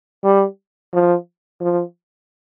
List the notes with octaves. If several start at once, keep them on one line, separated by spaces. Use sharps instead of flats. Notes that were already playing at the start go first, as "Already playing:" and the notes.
G3
F3
F3